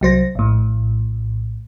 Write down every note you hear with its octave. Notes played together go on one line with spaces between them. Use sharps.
C2 F#3 C5 A#6
A#1 A2